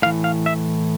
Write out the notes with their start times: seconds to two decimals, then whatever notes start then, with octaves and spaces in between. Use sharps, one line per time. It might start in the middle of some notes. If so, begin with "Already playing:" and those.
0.02 A2 F5
0.06 E3
0.24 F5
0.46 E5